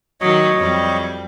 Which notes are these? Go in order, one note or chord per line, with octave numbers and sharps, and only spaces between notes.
D#3 F#3 C#5 D#5
F2 G3